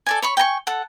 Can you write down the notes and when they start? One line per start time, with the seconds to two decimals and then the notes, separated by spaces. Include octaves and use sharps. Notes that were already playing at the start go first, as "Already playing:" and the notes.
0.06 A4 D5 G#5
0.22 C#5 B5 C#6
0.37 G5 G#5 A#5 C#6
0.67 A4 F#5